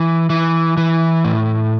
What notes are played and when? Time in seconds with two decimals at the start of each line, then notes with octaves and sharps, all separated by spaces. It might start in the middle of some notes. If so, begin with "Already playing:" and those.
Already playing: E3
0.30 E3
0.77 E3
1.25 A2